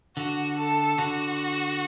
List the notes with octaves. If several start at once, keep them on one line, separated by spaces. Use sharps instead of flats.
D3 F#4
A4
D3 F#4